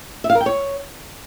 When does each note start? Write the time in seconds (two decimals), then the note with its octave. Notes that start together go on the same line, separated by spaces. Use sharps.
0.24 E5
0.30 F5
0.35 A#4
0.41 G5
0.46 C#5